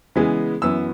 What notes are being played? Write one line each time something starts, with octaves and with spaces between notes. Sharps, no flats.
C#3 E3 G#3 B3
F#2 E3 B3 E6